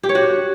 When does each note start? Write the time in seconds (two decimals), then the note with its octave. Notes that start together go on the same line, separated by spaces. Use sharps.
0.03 G4
0.09 C#5
0.15 F#4